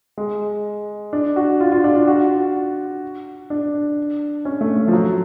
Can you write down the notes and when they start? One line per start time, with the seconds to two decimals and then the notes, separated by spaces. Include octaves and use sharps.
0.18 G#3
1.13 D4
1.36 F#4
1.60 F4
1.72 F4
1.84 D4
1.95 F4
2.07 F#4
3.50 D4
4.45 C#4
4.61 A3
4.77 A3
4.88 F3
4.93 F#3